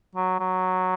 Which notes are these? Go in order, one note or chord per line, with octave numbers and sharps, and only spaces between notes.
F#3
F#3